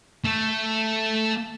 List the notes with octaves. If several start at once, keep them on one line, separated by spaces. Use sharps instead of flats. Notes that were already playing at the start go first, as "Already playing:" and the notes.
A3 A4